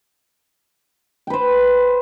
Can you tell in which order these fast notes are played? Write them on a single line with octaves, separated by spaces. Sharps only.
G5 B4 C5